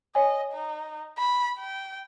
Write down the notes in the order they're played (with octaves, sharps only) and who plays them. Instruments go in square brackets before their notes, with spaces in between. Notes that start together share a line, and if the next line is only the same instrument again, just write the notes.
[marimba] C#5 G#5 [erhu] D#5
[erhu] D#4
B5
G5